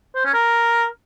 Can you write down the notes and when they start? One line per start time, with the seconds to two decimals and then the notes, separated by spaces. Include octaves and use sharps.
0.15 C5
0.24 C#4
0.34 A#4